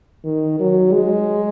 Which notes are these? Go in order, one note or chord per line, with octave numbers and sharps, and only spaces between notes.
D#3
F#3
G#3